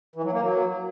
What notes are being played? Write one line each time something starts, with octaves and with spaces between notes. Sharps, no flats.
E3
F#3
A#3
F#3